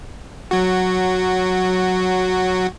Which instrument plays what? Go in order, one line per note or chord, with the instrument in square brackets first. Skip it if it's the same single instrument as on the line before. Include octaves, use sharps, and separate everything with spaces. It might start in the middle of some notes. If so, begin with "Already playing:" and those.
[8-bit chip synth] F#3 F#4